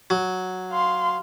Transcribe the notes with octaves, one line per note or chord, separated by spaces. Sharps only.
F#3
F5 C6